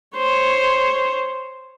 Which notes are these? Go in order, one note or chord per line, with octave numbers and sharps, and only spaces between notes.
C5 C#5